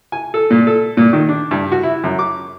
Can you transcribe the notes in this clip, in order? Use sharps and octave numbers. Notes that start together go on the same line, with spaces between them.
G#5
A4
A#2
A4
A#2
D#3
D4
G2
F#4
E4
F#2
D6